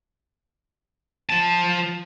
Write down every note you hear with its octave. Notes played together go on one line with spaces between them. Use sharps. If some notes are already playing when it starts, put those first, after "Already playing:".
F3 A5